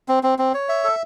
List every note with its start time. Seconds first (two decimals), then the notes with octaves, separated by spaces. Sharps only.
0.08 C4
0.23 C4
0.39 C4
0.54 C#5
0.69 E5
0.84 A4